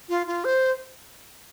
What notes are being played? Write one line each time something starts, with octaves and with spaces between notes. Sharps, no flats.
F4
F4
C5